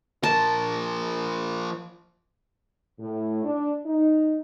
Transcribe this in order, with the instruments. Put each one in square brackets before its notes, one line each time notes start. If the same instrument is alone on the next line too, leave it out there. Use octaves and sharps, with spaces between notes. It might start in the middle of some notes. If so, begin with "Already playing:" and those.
[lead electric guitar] F3 A#4 [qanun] A5
[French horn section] A2
D4
D#4